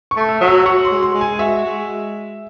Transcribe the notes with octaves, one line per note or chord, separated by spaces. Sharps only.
C#6
A3
E6
F#3
E6
F#4 C#6
C6
G#3
C6
G#3
G#5
F#4 E5
G#3